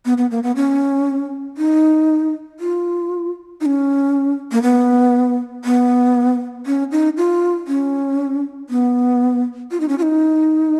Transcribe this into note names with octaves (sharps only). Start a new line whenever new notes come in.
B3
B3
A#3
B3
C#4
D#4
F4
D#4
C#4
A#3
B3
B3
C#4
D#4
F4
C#4
B3
F4
D#4
C#4
F4
D#4